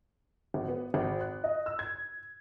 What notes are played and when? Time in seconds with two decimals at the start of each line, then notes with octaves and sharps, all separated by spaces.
0.54 G#1
0.68 B3
0.94 G#1
1.21 F#6
1.44 D#5
1.66 E6
1.79 G#6